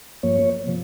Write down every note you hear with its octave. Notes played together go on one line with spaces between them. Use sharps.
G2 F3 A#3 C#5
C3 F3